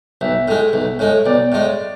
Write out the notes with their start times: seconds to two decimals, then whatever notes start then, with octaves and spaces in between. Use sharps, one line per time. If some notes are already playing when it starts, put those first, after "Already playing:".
0.21 B1 E5
0.48 A2 G#3
0.73 B1
0.99 A2 G#3
1.26 B1 D5
1.52 A2 G#3